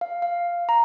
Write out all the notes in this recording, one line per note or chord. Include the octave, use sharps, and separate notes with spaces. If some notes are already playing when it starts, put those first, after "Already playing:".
F5
F5
A#5